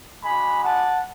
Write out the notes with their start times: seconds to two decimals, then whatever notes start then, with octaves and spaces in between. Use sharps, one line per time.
0.22 G#3 D4 F#4 G#5 B5
0.62 F#5 A5